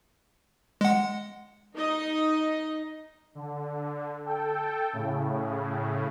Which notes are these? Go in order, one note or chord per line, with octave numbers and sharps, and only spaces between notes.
G#3 F#5
D#4 D#5
D3
A4 G5
A2 C#3